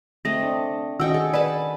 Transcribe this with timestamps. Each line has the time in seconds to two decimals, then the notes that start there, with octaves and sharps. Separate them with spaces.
0.25 A3 C4 D#5 A#6
0.43 D4
1.00 D#3 C#4 F#4 D#5 G5 C#6 E6
1.14 G#4 A4
1.34 B4 D5 A5